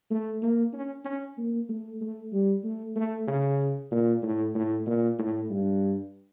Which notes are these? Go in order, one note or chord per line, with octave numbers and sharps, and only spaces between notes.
A3
A#3
C#4
C#4
A#3
A3
A3
G3
A3
A3
C#3
A#2
A2
A2
A#2
A2
G2